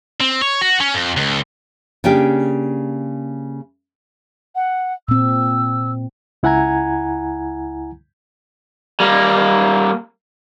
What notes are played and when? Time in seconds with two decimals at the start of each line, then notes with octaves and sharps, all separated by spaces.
0.20 C4
0.42 C#5
0.61 F#4
0.80 C#4
0.94 F2
1.17 C#2
2.04 C#3 A#3 D4 G4
4.55 F#5
5.09 A#2 C4 E6
6.43 C#2 E4 F#5 G#5 A#5 G#6
9.00 G3 A#3